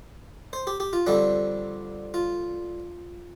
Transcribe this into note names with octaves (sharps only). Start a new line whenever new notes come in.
C5
G4
G4
F4
F2 D3 G3 C4 D4
F4